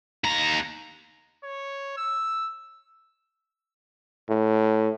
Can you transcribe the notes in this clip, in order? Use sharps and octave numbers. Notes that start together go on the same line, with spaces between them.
D#2 A#5
C#5
E6
A2